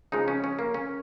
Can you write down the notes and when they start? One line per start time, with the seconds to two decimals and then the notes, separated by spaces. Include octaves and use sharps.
0.12 C#3 F3 G#3 D#4
0.28 C#4
0.44 C#4
0.59 A#3
0.74 C#4